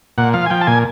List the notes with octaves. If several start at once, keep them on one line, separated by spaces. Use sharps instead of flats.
A#2 F#5
F3 F5
G#5
F3 G5
A5
A#2 G#5